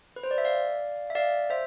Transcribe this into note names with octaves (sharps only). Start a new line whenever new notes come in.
B4
C5
D5
E5
D5 F5
E5
D5 F5
C5 E5